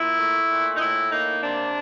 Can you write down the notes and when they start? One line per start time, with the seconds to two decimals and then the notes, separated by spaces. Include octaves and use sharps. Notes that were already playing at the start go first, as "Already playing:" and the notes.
Already playing: A#2 E4
0.19 A3
0.49 A#2
0.76 D#4
0.81 A2 E4
1.12 A#3 D#4
1.43 C3 D4